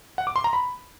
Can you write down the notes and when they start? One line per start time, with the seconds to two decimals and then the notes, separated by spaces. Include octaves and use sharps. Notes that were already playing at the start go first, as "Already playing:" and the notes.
0.18 F#5
0.27 D6
0.36 C6
0.44 A#5
0.53 B5